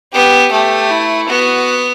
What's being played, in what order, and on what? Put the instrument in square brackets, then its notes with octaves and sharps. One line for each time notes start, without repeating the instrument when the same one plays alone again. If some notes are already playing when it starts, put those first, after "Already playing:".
[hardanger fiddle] B3 [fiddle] G4
[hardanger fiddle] A3 [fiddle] G4
[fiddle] E4
[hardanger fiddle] B3 [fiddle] F#4